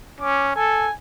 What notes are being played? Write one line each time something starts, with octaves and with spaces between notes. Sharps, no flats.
C#4 D6
A4 G#5